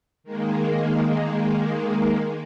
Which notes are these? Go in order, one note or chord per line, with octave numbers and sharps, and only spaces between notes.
D#3 G#3 A#3